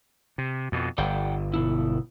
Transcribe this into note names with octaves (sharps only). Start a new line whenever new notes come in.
C3
F2 B2
G1 D5 F#5 G5
B2 B3 E4